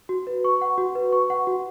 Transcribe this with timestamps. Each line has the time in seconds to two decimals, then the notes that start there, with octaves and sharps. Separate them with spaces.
0.09 F#4
0.27 B4
0.45 C#6
0.61 F#5
0.78 F#4
0.95 B4
1.12 C#6
1.30 F#5
1.47 F#4